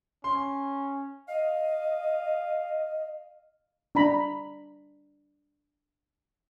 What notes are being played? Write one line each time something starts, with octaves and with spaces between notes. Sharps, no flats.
C#4 C6
D#5 F5
D4 A#5 B5